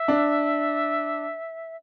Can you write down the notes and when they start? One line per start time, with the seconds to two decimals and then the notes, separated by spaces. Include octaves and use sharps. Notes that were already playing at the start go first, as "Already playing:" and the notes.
Already playing: E5
0.08 D4